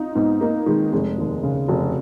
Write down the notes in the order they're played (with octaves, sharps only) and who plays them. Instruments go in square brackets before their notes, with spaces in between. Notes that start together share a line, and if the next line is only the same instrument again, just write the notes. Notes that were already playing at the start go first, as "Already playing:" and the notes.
Already playing: [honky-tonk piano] D#4 F4
[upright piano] G#2 [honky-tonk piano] B3
[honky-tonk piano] A#3 [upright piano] D#4
[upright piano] D#3 [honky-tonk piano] G#3
[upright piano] F1 [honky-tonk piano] G#3
[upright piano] D#2
C#3
[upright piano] F1 [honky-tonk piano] F#4